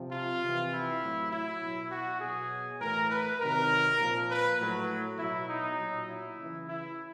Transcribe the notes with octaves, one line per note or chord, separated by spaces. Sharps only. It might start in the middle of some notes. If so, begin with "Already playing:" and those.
Already playing: C3 F3
F4
C3 E3
E4
A2 F#3
E4
B2 F#3
F#4
B2 F#3 G#4
A2 E3 A#4
B4
C3 D#3 F#3 A#4
A#2 F3
B4
A2 F#3
B2 F#3 E4
D#4
A#2 F#3
E4
C#3
E3
E4